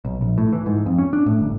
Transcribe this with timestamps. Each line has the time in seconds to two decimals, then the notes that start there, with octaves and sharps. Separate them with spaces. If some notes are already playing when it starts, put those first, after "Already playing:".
0.05 B1
0.21 A#1
0.38 A2
0.53 E3
0.66 G#2
0.86 F2
0.98 C#4
1.13 D4
1.26 A2
1.40 G1